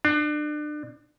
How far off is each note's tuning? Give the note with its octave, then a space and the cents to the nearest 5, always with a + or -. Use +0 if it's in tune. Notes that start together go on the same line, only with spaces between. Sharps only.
D4 +30